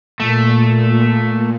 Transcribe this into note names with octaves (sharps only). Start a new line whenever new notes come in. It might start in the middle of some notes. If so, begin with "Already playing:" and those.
A#2 A3